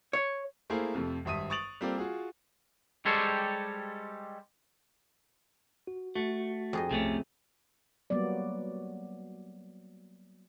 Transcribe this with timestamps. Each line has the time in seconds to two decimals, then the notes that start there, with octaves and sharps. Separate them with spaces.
0.13 C#5
0.70 A3 A#3 E4 G#4 C5 F5
0.94 F2 C3 F3 A3
1.25 G#1 G2 E5 D#6 D#7
1.50 C#6 D#6 A6 D7 F7 F#7
1.81 G3 A#3 C4 F4 A4 D5
1.98 F4 F#4 G#4
3.05 G3 G#3 G4 A4 C5 C#5
5.87 F#4
6.16 A3 F#4
6.73 F2 G#4 D#5
6.91 B1 C3 A3 C#4
8.10 F#3 G3 A#3 B3 D5